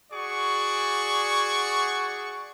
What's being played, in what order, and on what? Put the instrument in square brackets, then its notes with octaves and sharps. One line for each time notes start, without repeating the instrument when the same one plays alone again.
[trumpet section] F#4 G#4 D5 C#6